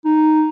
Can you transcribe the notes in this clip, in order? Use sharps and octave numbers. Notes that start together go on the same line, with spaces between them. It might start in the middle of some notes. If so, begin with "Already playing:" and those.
D#4